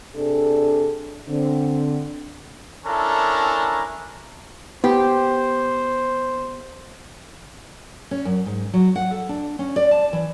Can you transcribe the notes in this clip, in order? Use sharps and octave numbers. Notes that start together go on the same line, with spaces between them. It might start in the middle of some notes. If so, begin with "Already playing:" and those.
C3 D4 G#4 A4
D3 C4
C#4 D4 E4 A4 A#4 A#5
B3 G4 C5
C#4
F#2
G#2
F#3
F#5
A4
D4
C#4
D5
A5
E3